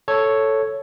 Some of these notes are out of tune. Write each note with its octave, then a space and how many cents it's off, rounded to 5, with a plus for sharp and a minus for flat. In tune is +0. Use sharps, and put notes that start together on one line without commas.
A4 +0 C#5 +0